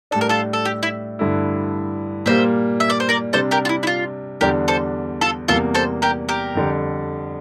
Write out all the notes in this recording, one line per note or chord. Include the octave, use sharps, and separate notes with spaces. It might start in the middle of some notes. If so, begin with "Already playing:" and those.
A2 G3 D4 A4
A#4
F4 A4
A4
G4
E4
G2 D3 A3 E4
A#2 G3 A#3 C5 E5
E5
D5
C5
A#4 D5
C3 G3 D4 A4 C5
G4 A#4
F4
E4
E4
F4
E2 D3 G3 D4 G4 A#4
A4 C5
F4 A4
E2 C3 G3 A#3 F4 A4
A4 C5
G4 A#4
G4 A#4
F2 D3 G3